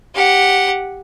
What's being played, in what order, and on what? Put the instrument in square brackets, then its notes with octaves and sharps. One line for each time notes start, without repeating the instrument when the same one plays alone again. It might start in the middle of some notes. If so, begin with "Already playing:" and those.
[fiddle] G4 F#5